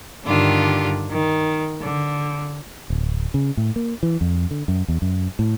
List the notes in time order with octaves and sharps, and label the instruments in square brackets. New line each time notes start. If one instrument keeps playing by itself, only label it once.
[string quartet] G2 D3 D#3 D4 F4 G4
D#3
D3
[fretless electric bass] D1
C#3
A2
A#3
E3
F2
D3
F#2
E2
F#2
A2